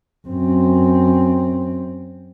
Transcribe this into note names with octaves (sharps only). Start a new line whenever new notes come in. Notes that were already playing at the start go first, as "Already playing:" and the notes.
F#2 C4